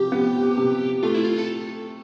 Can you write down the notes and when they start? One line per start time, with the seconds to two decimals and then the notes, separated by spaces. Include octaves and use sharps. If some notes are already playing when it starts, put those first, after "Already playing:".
Already playing: C3 F3 G4
0.12 B3
0.57 C3
1.03 A3 F4
1.14 E4
1.24 F4
1.38 A4